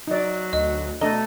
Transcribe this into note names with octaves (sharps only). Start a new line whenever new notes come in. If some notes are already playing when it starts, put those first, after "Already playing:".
F#3 D#4 D5
D2 D#5
B2 A3 D4 A4 D#5 A#5